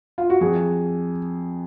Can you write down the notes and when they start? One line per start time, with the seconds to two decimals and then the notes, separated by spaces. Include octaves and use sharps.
0.18 F4
0.30 F#4
0.41 F2 G#4